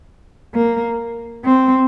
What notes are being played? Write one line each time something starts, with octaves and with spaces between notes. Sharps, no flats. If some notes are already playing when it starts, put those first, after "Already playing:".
A#3
C4